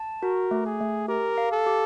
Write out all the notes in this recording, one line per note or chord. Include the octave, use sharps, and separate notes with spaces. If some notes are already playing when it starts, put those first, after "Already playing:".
Already playing: A5
F#4 A#4
A3
G#4
A3
G4 A#4
F5
A4
G4